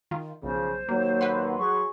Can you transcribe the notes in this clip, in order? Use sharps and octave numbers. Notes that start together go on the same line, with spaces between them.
D#3 F4
B1 C#3 F3 C5
D#2 F#3 A#3
B4 F#5 C6
F#3 G#4 C#6